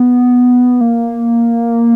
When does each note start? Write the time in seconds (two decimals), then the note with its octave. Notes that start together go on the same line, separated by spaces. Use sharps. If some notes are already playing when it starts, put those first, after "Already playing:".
Already playing: B3
0.81 A#3